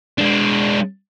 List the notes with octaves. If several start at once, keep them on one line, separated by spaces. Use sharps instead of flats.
G#3 D4